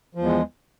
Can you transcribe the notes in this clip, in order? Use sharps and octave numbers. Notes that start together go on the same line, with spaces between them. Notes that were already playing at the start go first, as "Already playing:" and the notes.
E2 F3 G#3